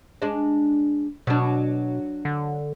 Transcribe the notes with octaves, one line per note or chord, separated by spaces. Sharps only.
G#3 D4
B2 F#3 D4
D3